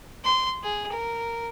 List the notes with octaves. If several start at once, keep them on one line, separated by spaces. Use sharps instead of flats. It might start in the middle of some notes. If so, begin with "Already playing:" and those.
C6
G#4
A#4